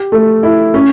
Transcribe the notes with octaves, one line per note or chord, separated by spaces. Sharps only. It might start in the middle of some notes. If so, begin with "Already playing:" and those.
Already playing: G4
A3
E4
C#4